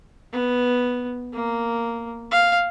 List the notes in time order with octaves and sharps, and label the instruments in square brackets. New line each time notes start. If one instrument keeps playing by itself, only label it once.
[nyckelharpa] B3
A#3
F5